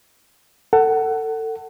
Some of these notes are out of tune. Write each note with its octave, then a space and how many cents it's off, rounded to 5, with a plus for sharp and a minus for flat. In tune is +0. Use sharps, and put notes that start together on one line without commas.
A4 +25 F#5 +20